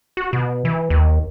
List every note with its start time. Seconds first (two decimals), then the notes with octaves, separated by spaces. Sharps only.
0.17 F#4
0.33 B2
0.65 E3
0.90 D#2